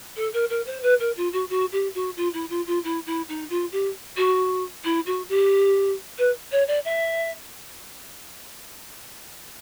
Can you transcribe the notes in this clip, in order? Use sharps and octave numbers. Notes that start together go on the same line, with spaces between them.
A4
A#4
A#4
C5
B4
A#4
F4
F#4
F#4
G4
F#4
F4
E4
F4
F4
E4
E4
D#4
F4
G4
F#4
E4
F#4
G4
B4
C#5
D5
E5